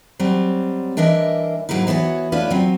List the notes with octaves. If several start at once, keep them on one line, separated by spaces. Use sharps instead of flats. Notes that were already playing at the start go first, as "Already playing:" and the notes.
F#3 G3 C4
E3 D4 A#4 D#5 E5
G#2 D3 F#3 G#3 A#3 E4
E3 B3 F#4 B4 C#5
A3 C#4 D4 F4 B4
F#3 C4